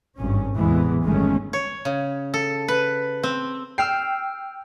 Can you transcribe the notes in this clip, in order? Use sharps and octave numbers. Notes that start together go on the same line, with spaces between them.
G#1 G2 C#4
A1 E2 C3 E3 G#3 B3
G1 D#3 G#3 A3 C#4
C#5
C#3
A4
B4
C4
G5 E6 F6 C7